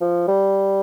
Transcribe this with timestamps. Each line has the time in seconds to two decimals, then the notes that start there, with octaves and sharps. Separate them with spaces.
0.01 F3
0.28 G3